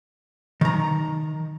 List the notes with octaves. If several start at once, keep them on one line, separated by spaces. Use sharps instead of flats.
D#3 A#5